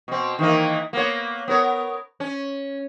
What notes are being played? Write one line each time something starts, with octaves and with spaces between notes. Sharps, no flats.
B2 C4
D#3 E3 A#3
A#3 B3 C#5
B3 A#4 C#5
C#4